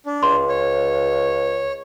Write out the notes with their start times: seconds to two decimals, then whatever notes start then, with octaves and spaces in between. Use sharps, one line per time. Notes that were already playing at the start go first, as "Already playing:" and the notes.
0.06 D4
0.23 C#2 C6
0.49 C#5